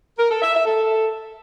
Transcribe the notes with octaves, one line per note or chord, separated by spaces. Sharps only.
A#4
A4
E5
E5
A4